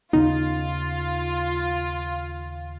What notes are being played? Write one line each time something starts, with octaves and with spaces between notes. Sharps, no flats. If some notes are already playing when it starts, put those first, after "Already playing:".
D#2 C#3 B3 D#4 F4